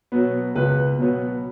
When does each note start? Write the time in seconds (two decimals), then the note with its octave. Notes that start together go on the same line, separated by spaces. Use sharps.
0.12 B2 F#3 B3
0.55 C#2 B4
0.99 B2 F#3 B3